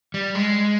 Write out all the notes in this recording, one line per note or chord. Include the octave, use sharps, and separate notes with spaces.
G3
G#3